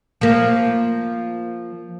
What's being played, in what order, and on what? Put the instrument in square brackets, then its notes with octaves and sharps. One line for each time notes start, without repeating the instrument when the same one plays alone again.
[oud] F3 A#3